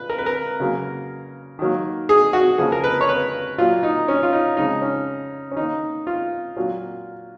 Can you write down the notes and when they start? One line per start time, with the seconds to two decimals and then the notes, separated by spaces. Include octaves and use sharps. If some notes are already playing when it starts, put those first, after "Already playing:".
Already playing: A#2 B4
0.10 A#4
0.18 B4
0.26 A#4
0.60 C#3 F#3 A#3
1.59 D#3 F#3 A#3
2.09 G#4
2.33 F#4
2.58 C#3 F3 A#3 G#4
2.72 A#4
2.84 B4
3.01 C#5
3.09 B4
3.58 A#2 F#3 A#3 F4
3.83 D#4
4.08 C#4
4.23 F4
4.33 D#4
4.57 C#3 F3 G#3 D#4
4.82 C#4
5.51 C#4
5.56 D#3 A#3 D#4
6.07 F4
6.56 A#2 F#3 A#3